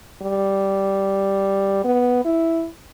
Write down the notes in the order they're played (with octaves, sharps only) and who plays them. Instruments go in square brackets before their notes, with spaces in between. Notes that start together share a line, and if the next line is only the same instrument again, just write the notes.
[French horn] G3
B3
E4